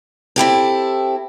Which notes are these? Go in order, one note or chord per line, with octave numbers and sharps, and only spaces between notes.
C4 E4 G4 A4